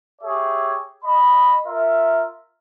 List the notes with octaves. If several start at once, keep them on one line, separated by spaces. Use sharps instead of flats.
G4 G#4 C#5 E5
D#5 B5
F4 A#4 E5